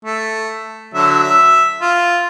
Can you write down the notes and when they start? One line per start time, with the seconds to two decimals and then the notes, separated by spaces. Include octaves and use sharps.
0.05 A3
0.94 D3 F#3 E5
1.23 E5
1.82 F4